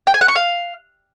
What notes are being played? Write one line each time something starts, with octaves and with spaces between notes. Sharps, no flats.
G5
G#5
F#5
C#6
F5